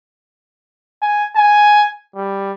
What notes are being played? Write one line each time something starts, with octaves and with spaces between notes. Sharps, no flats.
G#5
G#5
G3